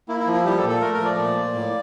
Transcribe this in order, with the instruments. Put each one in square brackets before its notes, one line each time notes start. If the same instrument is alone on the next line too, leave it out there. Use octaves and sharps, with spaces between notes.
[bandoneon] A#3 E4
E4
F3
E4
G3 G4
A4
A#2
A4
A3 A#4
A#4
F3 D5
A#2
A#3
A2